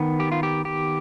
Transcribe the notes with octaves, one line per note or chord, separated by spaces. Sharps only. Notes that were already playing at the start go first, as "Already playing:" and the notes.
Already playing: D#3 B3
G4
F4
G4
G4